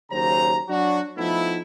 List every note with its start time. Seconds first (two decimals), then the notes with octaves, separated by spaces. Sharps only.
0.11 D#2 C#3 F#3 C5 A#5
0.69 F#3 D4 F#4
1.18 F3 A3 B3 D#4 E4